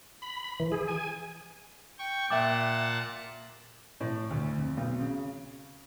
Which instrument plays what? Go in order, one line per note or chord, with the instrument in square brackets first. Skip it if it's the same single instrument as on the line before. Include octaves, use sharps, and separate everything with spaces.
[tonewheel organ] B5
B5
E3
G#4
G#5
[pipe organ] G5 C#6
[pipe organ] A#2 F#5 A5 [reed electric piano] E5 G5 D6
[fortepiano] A2
D2
F2
B1
C#3